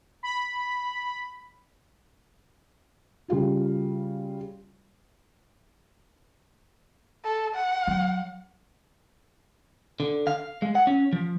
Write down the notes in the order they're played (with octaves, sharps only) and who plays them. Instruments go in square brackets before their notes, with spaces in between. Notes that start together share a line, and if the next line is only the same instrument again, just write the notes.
[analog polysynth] B5
[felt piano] C#3 G3 F4 F#4
[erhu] A4
F#5
[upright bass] F#3
[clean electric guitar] D3
F5
G#3
F#5
C#4
F3